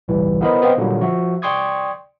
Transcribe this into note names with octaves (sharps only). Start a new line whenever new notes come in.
G1 C2 A2 E3 G3
B3 E4 A#4 C5 D#5 B5
B3 C4 C5 D#5 F5 G5
A#2 D3 F#3 G3 A#3
F3 F#4 E5
D5 G5 C6 C#6 D#6 G#6